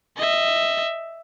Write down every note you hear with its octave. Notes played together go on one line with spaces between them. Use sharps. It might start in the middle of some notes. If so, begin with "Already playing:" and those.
D#5 E5